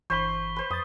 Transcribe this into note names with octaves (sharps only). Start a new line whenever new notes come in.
G1 E3 C5 B5 C#6 B6 G7
B4 C5
F2 D#6 A6